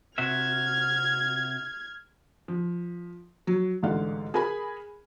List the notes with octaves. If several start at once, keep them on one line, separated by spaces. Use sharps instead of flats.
C3 F#4 E5 F6 G#6
F3
F#3
A1 G#2 D3 D4 F5 F#5
G#4 A#4 G#5 B5